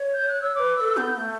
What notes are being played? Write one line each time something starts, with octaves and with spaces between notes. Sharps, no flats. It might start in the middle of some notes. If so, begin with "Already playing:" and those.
Already playing: C#5
G6
F#6
E6
B4 C#5 D6
A4 B4 E6
B3 G6
G6
A3